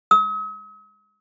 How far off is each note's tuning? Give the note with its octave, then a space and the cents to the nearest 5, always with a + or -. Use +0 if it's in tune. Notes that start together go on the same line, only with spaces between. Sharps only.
D#6 +45